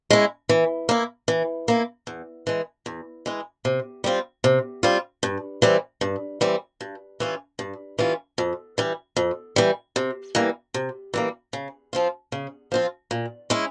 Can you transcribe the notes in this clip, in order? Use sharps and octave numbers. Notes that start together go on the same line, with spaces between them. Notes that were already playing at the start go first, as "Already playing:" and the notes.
G#3 C#4 E4
E3
A#3 E4
E3
A#3 E4
E2
E3 G#3
E2
E3 G#3
C3
G3 C4 F4
C3
G3 C4 F4
G2
E3 G3 C4
G2
E3 G3 C4
G2
E3 G3 C#4 F4
G2
E3 G3 C#4 F4
F2
E3 G3
F2
E3 G3
C3
E3 G3 A#3
C3
E3 G3 A#3
C#3
F3 C4 F4
C#3
F3 C4 F4
A#2
G#3 C#4 E4